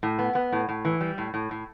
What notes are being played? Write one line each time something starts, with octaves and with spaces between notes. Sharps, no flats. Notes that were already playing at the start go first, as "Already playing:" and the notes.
A2
B3
B3
A2
A2
E3
G3
A2
A2
A2